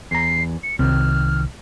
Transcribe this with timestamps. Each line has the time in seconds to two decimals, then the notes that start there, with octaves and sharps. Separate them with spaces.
0.11 E2 A#5 C7
0.63 C#7
0.79 C2 D#3 C4 F6